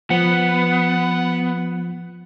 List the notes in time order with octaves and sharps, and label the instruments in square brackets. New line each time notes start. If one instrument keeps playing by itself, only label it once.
[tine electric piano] F3 [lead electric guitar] B3 [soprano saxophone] F#5